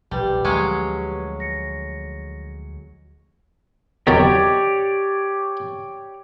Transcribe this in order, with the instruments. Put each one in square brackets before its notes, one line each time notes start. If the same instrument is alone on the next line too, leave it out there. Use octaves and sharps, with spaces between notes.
[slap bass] A#1 [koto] G3 [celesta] G4 B4 A5
[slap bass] D2 F3 A3 [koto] F#3 G#3 C#4
[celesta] A#6 C#7
[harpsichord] E2 D#3 F#3 [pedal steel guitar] G4 C#5 D5